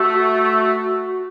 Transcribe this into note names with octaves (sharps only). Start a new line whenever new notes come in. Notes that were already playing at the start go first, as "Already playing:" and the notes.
Already playing: A3 F#4